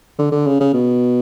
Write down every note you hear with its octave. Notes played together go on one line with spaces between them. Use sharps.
D3
D3
C#3
C#3
B2